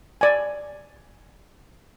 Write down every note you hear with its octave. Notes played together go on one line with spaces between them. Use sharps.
D5 G#5